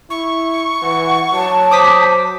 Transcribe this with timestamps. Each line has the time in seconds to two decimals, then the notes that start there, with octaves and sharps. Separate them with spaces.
0.10 E4 C#6
0.82 E3 F#5
1.34 F#3 A5
1.71 C5 D6 D#6 B6